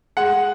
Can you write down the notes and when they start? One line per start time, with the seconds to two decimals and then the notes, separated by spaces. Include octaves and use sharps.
0.17 G#3 F#5
0.33 G#3